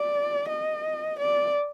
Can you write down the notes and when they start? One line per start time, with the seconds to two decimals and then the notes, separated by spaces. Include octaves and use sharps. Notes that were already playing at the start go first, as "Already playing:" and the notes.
Already playing: D5
0.48 D#5
1.19 D5